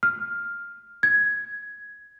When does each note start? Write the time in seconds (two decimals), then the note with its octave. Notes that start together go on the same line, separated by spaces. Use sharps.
0.03 F6
1.03 G#6